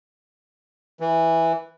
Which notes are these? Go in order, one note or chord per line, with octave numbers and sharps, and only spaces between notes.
E3